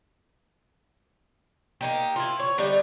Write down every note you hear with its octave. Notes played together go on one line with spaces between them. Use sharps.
A#3 D#4 G4
E4 F4
C#5
D3 G3 D#4 E5